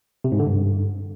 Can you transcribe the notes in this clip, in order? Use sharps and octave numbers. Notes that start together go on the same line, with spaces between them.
C3
G#2
D3
G2